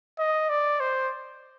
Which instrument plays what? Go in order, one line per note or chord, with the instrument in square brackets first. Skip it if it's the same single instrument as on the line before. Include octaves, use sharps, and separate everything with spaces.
[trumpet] D#5
D5
C5